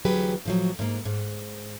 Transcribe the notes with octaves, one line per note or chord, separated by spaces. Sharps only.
D2 E3 F#3 G4 G#4 B4
A2 F3 F#3
G#2 A#3
G#2